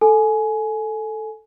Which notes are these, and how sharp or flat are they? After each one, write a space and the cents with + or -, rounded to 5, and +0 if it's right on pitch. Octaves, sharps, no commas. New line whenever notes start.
A4 +0 G#5 +20